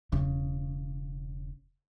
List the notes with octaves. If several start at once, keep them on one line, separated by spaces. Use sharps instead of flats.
E1 C#3